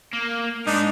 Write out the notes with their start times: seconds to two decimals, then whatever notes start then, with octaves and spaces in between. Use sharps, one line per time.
0.13 A#3
0.67 G#2 D4 D#4